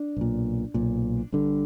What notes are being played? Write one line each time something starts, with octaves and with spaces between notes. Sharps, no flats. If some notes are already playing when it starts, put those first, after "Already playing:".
Already playing: D4
B1 A#2
B1 A#2
G1 G2 D3